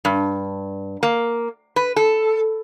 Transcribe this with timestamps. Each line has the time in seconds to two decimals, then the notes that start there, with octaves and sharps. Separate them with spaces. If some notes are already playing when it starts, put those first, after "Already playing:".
0.05 G2
1.03 A#3
1.76 B4
1.96 A4